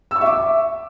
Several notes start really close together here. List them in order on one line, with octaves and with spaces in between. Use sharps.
E6 C#6 E5 D6